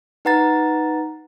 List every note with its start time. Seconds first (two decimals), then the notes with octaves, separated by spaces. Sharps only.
0.25 D#4 B4 F#5 A#5 A6